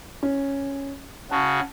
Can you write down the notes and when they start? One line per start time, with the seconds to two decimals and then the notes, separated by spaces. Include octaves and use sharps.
0.23 C#4
1.31 C#3 F#4 A5